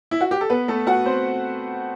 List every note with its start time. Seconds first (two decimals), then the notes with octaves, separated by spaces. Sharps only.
0.11 E4
0.21 F#4
0.31 G4
0.41 A4
0.50 B3 B4
0.68 A3 A4
0.87 F#4 F#5
1.06 C4 C5